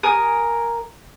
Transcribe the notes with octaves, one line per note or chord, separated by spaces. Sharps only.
A#4 G#5 D#6